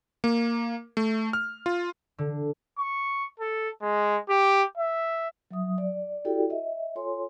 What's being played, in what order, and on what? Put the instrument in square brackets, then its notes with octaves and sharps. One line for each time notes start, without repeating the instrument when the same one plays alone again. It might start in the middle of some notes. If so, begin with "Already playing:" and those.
[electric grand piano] A#3
A3
F6
F4
[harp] D3
[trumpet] C#6
A4
G#3
G4
E5
[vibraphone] F#3 E5 D#6
D5
E4 F#4 G4 A4 D5 G5
D#5 E5
F4 A4 C#5 G#5 C6